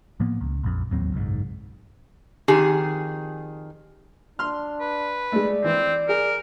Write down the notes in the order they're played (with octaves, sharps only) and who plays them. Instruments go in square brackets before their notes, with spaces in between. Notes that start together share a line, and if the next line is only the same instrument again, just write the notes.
[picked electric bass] A2 F3 A#3 B3
C#2
A#1 F2
A1 D#2 F#3 C4
F#1 B1 G#2
[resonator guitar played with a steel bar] F2 D#3 G#4 [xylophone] G4
[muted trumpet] D4 [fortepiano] C6 F6
[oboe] B4
[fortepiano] G#3 A3 [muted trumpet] D5
[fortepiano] E3 [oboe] C4
[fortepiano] G#4 [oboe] A#4